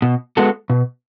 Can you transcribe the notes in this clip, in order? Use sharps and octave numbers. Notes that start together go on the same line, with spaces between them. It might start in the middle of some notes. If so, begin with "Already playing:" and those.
B2
G#3 B3 F#4 A4
B2